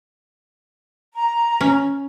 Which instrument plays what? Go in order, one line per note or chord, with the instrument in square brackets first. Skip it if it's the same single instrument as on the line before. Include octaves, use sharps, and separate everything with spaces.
[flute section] A#5
[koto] C#4